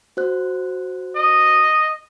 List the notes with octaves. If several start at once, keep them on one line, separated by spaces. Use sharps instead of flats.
F#4 C5 F#6
D#5